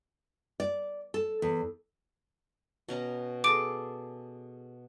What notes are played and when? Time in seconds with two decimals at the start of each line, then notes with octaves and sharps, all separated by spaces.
0.60 D5
1.14 A4
1.42 E2
2.88 B2 C#4 A#5
3.44 G#4 A4 D6 D7